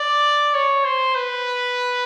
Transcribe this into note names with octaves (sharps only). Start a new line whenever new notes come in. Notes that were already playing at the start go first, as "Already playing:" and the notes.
Already playing: D5
C#5
C5
B4